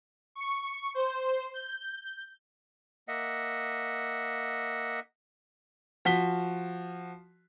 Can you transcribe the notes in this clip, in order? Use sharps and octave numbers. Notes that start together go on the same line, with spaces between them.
C#6
C5
G6
A#3 D#5 E5 F#5
F3 F#4 B6 G7